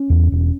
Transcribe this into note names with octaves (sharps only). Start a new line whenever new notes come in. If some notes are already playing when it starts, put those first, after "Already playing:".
Already playing: C#4
E2
E1